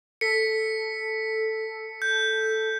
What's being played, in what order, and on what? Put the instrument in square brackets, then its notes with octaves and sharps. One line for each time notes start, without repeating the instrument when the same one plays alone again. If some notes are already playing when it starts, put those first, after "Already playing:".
[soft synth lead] A4 [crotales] B6 C#7
[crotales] G6